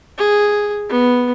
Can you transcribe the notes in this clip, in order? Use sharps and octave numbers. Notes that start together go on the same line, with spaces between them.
G#4
B3